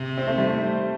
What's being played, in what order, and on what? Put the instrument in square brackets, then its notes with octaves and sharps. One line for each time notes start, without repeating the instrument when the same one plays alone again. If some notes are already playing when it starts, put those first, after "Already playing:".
Already playing: [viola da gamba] C3
[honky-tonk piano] C4
A3
G3
A3